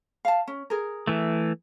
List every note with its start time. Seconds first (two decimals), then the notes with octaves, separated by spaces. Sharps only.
0.25 F5 A5
0.47 C#4
0.70 G#4 A#4
1.07 E3 A3